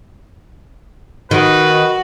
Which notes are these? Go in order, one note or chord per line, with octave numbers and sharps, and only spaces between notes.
D#3 F#4 B4